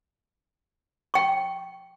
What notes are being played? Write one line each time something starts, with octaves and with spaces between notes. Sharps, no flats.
G5 C#6